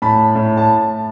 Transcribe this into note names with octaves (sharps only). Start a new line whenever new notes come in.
A2 A5 B5
A2
A5